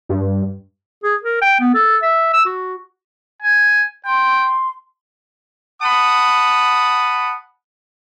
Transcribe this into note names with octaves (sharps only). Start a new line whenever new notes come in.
G2
G#4
A#4
G5
B3
A4
E5
E6
F#4
G#5
G5 C6
F#5 A5 B5 D#6